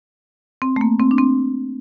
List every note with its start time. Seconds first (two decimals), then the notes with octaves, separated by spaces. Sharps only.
0.62 C4
0.76 A3
0.81 A#3
1.00 C4
1.11 D4
1.18 C4